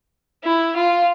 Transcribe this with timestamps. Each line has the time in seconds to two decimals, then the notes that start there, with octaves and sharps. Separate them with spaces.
0.43 E4
0.76 F4